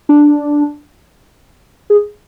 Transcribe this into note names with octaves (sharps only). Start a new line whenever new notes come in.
D4
G#4